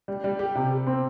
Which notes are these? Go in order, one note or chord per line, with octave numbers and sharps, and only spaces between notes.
G3
G3
G4
C3
G4
C4